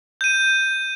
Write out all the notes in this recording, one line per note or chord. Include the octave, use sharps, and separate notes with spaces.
G6 D#7